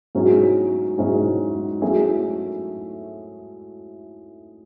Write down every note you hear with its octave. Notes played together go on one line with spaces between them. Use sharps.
G#2 F#3 C#4 E4 G#4
G#2 F#3 C#4 E4 G#4
F#3 A3 C#4 E4 G#4